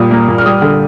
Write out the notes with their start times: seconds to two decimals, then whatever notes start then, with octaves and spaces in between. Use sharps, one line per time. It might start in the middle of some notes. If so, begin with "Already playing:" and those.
Already playing: A#2 G3 D#6
0.11 A#3
0.28 A#2
0.38 F6
0.45 G3 D#6
0.62 D3